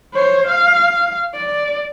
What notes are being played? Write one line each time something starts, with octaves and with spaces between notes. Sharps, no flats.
C5 C#5
F5
D5